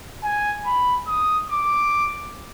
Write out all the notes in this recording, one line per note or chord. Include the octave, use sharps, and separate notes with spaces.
G#5
B5
D#6
D6